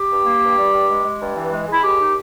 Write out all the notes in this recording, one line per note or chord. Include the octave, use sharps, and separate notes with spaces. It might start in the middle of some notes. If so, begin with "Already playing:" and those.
Already playing: G4
G2
A#3
G2
G3
G2
G#3
G#3
G2
E3
G#3
G#3
E4
D#2 G4
D#4